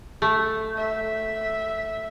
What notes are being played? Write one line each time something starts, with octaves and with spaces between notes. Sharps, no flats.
A3
E5